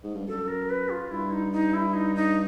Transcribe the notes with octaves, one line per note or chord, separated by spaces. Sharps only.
G#2
G2
F#2 A4
A#4
B4
F4
G2 E4
D#4
D#4
E4
D#4
D#4